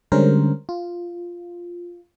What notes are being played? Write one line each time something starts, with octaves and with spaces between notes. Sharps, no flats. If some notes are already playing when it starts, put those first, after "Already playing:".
D3 G3 G#3 C#4 A#4 C5
F4